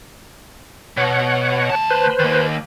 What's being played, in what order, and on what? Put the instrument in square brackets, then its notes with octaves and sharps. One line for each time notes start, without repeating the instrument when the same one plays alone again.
[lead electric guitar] B2 [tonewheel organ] C#5 F#5
[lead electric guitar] D2 A5
[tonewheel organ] B4 C5
[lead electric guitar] D#3 A#3